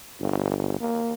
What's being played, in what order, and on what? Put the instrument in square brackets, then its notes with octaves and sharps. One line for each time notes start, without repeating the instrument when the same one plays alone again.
[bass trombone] G1
A#3